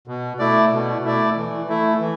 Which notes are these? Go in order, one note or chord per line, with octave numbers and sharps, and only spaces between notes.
B2
A3 E4 D5
B2
A3 E4 D5
E3
A3 E4
E3